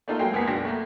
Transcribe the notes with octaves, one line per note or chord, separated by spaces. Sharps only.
A3 A#3 D#4 F4 A4
F#3 G#3 A#3 G5 C7
C#2 A#3 B3 G#5 B6
F#1 B2 D4 G5 A#6
A3 A#3